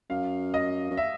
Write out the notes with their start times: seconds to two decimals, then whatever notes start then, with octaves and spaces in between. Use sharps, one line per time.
0.10 F#2 F5
0.54 D#5
0.90 F#2
0.97 E5